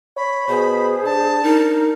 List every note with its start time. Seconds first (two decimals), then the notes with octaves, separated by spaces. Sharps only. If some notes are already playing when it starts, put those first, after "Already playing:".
0.17 C#5 B5
0.49 B2 G#4 C5
1.05 D4 A5
1.43 D#4 A#4